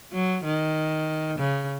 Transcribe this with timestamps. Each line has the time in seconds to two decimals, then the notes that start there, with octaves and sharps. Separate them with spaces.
0.12 F#3
0.44 D#3
1.38 C#3